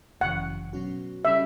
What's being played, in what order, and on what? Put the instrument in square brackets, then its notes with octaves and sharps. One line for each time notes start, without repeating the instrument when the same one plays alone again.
[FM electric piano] G1 F#2 C#3 E3 [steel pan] F#5
[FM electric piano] B2 F#3 C#4 F#4
[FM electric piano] C#3 G3 C#4 [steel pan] E5